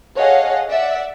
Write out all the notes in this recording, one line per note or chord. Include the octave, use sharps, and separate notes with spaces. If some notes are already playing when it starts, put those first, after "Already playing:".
G#4 A4 C#5 D#5 F5 F#5
D5 E5 F#5